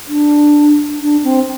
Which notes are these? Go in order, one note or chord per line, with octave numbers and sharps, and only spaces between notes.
D4
D4
C4